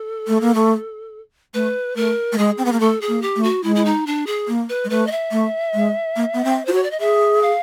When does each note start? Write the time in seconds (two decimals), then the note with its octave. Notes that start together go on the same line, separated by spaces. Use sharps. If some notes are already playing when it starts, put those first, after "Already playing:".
Already playing: A4
0.28 A3
0.41 A#3
0.55 A3
1.54 A3 B4
1.96 A3 A#4
2.32 A3
2.38 G#3 G#4
2.58 C4
2.65 B3
2.72 A#3
2.80 A3 A4
3.01 G#4
3.08 A#3
3.22 G4
3.36 A3
3.43 F#4
3.63 G#3 E4
3.76 E4
3.85 D#4
4.07 D4
4.27 G#4
4.48 A#3
4.69 B4
4.84 G#3
4.90 A3 B4
5.07 D#5
5.11 E5
5.32 A3
5.74 G#3
6.16 A#3
6.34 B3
6.44 C4
6.65 F4 C5
6.72 F#4 C#5
6.83 D5
6.91 D#5
7.00 G#4 E5
7.42 F5